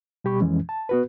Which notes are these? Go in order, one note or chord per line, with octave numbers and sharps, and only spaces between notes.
B2 G3 G4 B5 C#6
F2 E3 F3 G#3 C#4
A5
B3 F#4 B4